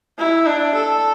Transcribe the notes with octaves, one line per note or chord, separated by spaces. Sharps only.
E4
D4
A4